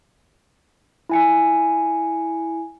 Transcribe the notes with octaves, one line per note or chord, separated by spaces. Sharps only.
E4 G#5 C#7